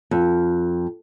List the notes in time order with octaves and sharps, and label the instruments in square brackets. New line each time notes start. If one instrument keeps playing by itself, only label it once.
[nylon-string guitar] F2